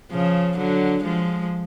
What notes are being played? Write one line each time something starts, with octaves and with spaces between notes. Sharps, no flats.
C#3 F3
D3 F#3
F3 G#3